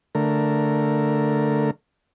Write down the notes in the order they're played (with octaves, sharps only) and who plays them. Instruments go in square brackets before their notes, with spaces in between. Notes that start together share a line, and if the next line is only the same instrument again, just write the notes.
[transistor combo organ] D3 A3 A#4